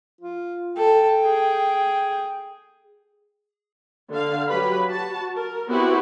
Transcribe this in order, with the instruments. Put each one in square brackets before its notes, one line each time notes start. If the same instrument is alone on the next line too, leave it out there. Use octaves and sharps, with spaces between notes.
[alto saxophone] F4
[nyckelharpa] A4 [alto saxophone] G5
[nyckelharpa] G#4
[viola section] D3 F5
F#3 G4 B4 B5
F#4 A5
A#4
B3 C4 E4 F#4 G4 B4